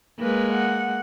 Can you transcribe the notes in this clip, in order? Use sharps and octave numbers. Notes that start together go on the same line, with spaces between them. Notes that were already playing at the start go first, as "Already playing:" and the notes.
G#3 A#3 B4
F#5